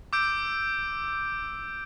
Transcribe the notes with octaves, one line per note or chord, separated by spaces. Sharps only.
D6 E6 G6 D7